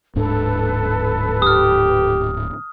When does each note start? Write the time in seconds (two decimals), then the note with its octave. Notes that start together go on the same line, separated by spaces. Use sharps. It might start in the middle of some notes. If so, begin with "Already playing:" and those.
0.15 D1 G#2 D4 A4 B4
1.42 G4 D#6 F6